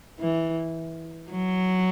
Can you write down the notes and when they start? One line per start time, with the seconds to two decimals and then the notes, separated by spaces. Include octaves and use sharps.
0.20 E3
1.31 F#3